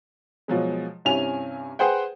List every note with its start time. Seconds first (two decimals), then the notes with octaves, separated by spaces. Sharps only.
0.48 B2 F3 F#3 G#3
1.05 G2 C3 C#4 E4 G#5 F7
1.79 G#4 B4 C5 F#5 G5